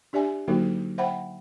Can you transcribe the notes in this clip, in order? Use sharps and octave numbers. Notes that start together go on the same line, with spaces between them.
D4 G4 D5 E5 G#5
D3 F#3 A#3 D#4 F#4 A4
C5 E5 F#5 G5 B5